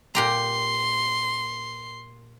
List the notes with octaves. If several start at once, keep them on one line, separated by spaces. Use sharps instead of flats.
A#2 G4 A#5 C6